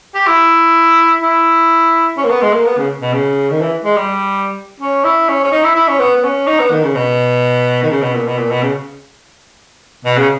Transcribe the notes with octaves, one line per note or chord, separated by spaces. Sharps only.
G4
E4
E4
C#4
A#3
B3
G#3
A#3
B3
C#3
B2
C#3
D#3
E3
G#3
G3
C#4
E4
C#4
C#4
D#4
E4
E4
C#4
B3
B3
C#4
D#4
B3
D#3
C#3
B2
D#3
C#3
B2
A#2
B2
A#2
B2
C#3
B2
C#3